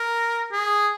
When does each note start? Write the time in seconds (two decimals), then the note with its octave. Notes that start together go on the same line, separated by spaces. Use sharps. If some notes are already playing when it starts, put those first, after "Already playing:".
Already playing: A#4
0.52 G#4